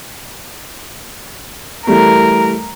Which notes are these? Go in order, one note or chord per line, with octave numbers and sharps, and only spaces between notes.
E3 G3 A3 A#4